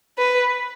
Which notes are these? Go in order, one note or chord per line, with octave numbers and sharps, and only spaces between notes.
B4